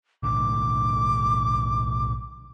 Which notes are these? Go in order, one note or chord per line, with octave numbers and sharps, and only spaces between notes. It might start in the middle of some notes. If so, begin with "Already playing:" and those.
B1 A2 D3 D6